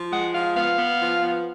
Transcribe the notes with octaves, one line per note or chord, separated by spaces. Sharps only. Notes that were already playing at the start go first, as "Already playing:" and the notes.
Already playing: F3
G#3 F#5
F3 F5
B3 F5
B3
F3
B3